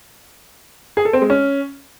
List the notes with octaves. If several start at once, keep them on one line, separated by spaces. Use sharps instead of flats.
G#4
A4
C4
G#3
C#4